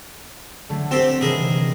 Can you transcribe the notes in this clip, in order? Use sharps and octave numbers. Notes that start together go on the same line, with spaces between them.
D3 F#3 A3
C4 G4 A4
C3 D#3 E3 G#4 A#4